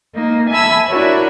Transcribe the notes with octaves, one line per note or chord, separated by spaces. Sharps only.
A#3 D#4
E5 G#5 A5 B5 E6
D4 E4 F#4 A#4 C#5